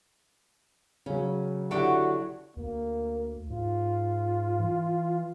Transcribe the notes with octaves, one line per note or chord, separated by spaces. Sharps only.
C#3 F#3 C#4
D3 F#3 E4 F#4 G4 F#5
D2 A#3
G#2 F4
E3